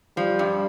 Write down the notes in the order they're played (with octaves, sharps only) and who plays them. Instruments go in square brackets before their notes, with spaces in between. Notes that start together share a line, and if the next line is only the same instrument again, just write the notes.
[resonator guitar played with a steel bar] F3 [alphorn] G3
[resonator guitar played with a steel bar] G2